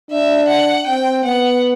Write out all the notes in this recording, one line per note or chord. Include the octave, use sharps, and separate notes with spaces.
D4 E5
F#5
C4 G5
B3 F#5